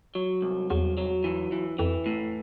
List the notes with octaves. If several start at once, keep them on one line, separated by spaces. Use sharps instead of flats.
F#3
C2
E2 F#3
F#3
E3
E3
F2 E3
A2